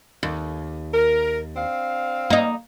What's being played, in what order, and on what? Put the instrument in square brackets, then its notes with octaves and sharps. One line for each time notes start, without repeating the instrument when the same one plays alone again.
[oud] D#2
[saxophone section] A#4
C4 D4 F5
[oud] A#3 D#4